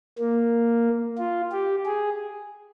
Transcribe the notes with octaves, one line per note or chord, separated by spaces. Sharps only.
A#3
F4
G4
G#4